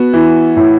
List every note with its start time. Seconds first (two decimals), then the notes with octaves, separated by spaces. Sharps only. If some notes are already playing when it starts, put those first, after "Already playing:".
Already playing: B3 F#4
0.13 E3
0.57 A2